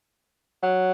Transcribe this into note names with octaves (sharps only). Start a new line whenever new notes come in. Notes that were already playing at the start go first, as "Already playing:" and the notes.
F#3